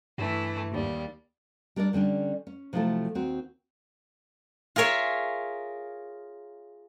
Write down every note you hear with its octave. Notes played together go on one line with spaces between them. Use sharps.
G2 E3 A3 E4
D#2 G3
G3 D4 A#4 C#5 D5
D3 G3 C#4 D4
C#4
C3 F3 F#3 A3 E4 A4
D#2 C4 F#4
F4 G#4 A#4 C#5 E5